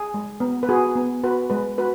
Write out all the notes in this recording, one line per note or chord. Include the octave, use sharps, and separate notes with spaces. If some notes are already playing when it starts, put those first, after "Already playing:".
Already playing: G#4
G#3
B3
B4
F#4 G#4
B3
F#4 B4
G#3 B4
F#4 B4